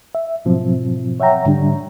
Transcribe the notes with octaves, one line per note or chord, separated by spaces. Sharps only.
E5
G#2 B2 F3 F#3 C4
C#5 E5 F#5 G5 A#5
G#2 D3 G3 D4